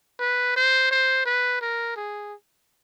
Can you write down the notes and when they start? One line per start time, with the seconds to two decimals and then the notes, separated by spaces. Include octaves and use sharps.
0.20 B4
0.56 C5
0.91 C5
1.26 B4
1.61 A#4
1.96 G#4